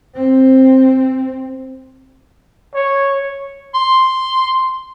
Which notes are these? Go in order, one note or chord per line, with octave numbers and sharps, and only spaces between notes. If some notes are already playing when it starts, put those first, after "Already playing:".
C4
C#5
C6